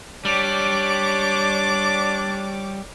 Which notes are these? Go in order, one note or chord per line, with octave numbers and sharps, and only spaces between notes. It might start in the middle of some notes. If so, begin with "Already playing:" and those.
G3 D4 C#5 D6